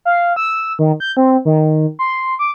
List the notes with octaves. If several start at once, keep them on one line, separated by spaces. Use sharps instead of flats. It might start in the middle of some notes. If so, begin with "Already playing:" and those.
F5
E6
D#3
G6
C4
D#3
C6
D6